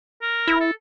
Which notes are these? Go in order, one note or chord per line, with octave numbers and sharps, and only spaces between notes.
A#4
E4
A4